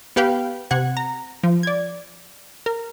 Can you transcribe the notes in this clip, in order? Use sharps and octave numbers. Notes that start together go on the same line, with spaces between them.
B3 G4 B4 F5 G5
C3 F#5 G#6
A#5
F3
D5 G#6
A#4